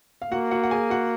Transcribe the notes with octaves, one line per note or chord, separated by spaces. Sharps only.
F5
A#3 F#4 F#5
F#4 F#5
F#5
G#4 G#5
F#4 F#5